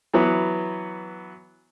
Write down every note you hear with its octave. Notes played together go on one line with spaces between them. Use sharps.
E3 F#3 B3